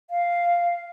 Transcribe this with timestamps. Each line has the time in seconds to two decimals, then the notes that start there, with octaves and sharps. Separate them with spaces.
0.10 F5